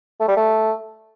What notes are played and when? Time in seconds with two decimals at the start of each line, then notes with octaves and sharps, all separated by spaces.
0.20 A3
0.28 G3
0.37 A3